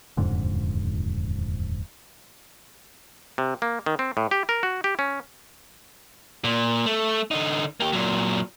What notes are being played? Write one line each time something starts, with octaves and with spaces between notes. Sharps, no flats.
D#1 F2 G#2 D3
C3
A#3
D#3
C4
A2
G4
A#4
F#4
G4
C#4
A#2
A3
D3 D#4
A#3 G4
A#2 F#3